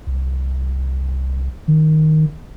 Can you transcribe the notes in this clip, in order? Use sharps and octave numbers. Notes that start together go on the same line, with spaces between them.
C2
D#3